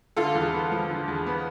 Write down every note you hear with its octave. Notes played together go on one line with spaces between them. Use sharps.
D3 F4 A4
E2
B3
F3
D3
E2
B3